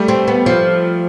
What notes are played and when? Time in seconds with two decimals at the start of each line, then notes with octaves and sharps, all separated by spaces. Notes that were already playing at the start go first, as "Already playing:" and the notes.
Already playing: G3 A3
0.08 C4
0.28 B3
0.46 F3